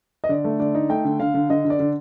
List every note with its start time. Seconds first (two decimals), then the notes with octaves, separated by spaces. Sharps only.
0.24 D#5
0.29 D3 D5
0.44 A3
0.60 D3 D5
0.75 D#4
0.89 A3 G5
1.04 D3
1.20 D3 F5
1.34 D3
1.50 D3 D#5
1.65 D3
1.70 D5
1.80 D3